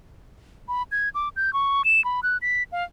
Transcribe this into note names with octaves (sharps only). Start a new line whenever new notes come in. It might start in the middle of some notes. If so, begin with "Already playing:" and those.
B5
G#6
D6
G6
C#6
E7
B5
F#6
B6
F5